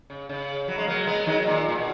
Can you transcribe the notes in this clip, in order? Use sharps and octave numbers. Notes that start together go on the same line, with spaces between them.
C#3
C#3
F#3
G#3
F#3 A#3
G#3 B3
D#3 F#3
A#2
A#2
B2